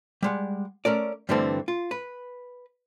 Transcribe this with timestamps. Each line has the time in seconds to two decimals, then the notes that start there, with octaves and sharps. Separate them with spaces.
0.23 G3 G#3 F#5
0.85 A3 C#4 A#4 D5
1.29 G2 D3 E3 G3 A3 C4
1.68 F4
1.91 B4